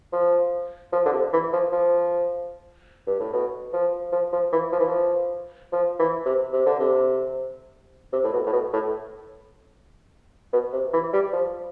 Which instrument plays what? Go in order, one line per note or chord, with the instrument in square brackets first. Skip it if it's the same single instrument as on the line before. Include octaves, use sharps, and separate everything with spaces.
[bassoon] F3
F3
D3
C3
E3
F3
F3
G2
A2
B2
F3
F3
F3
E3
F3
E3
F3
F3
E3
C3
C3
D3
C3
C3
A2
B2
A2
B2
A2
B2
C3
E3
G3
F3